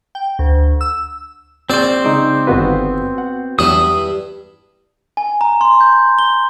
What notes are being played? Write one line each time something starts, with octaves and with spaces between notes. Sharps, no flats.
G5
D2
E6
A#1 C4 C5 D5
C#3 G#3 D#4 D6
G1 D#3 B3 F4 F#4 B4
F#5
E2 G2 F#3 E4 D5 D#6
G#5
A#5
C6
G6
G7